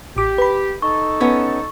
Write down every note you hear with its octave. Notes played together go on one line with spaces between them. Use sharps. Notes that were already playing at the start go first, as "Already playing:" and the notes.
A1 G4 D6
B4 B5
D#4 A4 C#6
B3 C#4